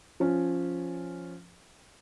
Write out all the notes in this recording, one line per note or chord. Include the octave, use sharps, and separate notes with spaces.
F3 C#4